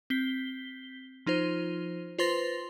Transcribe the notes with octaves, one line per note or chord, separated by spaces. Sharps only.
C4 B6 G7
F3 D#4 F4 C5
F4 B4 C5 C6 A6 A#6